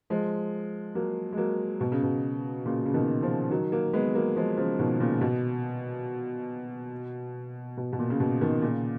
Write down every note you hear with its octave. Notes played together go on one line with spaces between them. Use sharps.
F3 G#3
F#3 A#3
G#3
F#3 A#3
B2
C#3
B2
A#2 C#3
C#3
B2 D#3
C#3 F3
D#3 F#3
F#3 A#3
G#3 B3
F#3 A#3
F3 G#3
C#3 F3
B2 D#3
A#2 C#3
B2
B2
B2
A#2
C#3
B2
B2 D#3
A#2 C#3